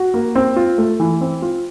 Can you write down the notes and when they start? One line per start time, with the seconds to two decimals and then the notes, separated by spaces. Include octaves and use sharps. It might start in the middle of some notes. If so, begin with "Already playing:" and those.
Already playing: F#4
0.14 A#3
0.35 C4
0.56 F4
0.78 A3
1.00 E3
1.21 C4
1.42 F4